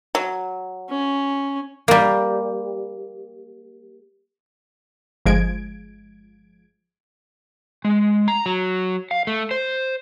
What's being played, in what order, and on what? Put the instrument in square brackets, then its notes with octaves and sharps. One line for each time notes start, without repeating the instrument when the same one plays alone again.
[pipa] F#3
[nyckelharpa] C#4
[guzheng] G3 A#3
[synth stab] G1 F3 G#3 G#6 D7
[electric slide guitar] G#3
A#5
F#3
F5
A3
C5